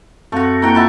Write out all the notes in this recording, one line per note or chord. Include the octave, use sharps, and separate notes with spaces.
F#2 A3 C4 F#4 F5
A#3 E4 F#4 G5 A#5
F4 E5 F#5 A5 B5